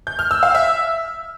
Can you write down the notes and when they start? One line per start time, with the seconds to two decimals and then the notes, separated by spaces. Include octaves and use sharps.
0.07 G6
0.19 F6
0.31 E6
0.43 F5
0.55 E5